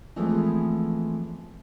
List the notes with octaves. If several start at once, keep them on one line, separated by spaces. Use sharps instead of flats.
E3 F3 G#3 A3 B3 C4